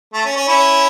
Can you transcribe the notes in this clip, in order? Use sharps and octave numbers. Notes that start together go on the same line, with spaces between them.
A3
C#4
C#4
C#4 E4